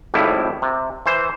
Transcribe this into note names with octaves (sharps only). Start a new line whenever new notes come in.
G#1 F2 A2 G3 E4
C3
E3 C5